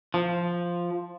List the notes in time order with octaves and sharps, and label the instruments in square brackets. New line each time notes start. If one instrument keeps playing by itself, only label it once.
[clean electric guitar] F3